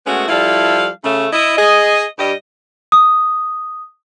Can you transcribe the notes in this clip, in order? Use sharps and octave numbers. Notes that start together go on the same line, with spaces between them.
G#3 A3 B3 C#4 F#4
F3 G3 E4 A4 F5
C#3 A3
E4 D#5
G#4 D#5
G2 G3 G4 D#5
D#6